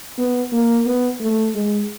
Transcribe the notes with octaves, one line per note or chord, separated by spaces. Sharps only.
B3
A#3
B3
A3
G#3